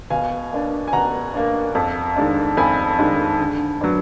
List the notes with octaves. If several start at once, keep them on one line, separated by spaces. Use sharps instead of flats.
B2 F5 G#5
A#3 D4
G#5
B2 F#5 A#5
A#3 D4
F2
D#3 G#3 D4
F2 G#5 B5
D#3 G#3 D4
D3
F#3 B3 D4